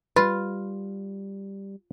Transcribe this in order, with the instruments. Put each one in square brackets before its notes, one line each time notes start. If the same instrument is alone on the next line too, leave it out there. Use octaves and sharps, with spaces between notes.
[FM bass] G3 [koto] F4 [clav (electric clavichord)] B4